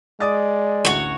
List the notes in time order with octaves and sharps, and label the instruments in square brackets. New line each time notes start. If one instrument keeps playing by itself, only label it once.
[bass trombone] G#3 [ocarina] D5 [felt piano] D6 D#6 A6
[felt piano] A1 D2 [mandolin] F#4 C#5